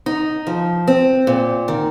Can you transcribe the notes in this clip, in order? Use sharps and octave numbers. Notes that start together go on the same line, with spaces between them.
D#4
F3
C4
A#2
D#3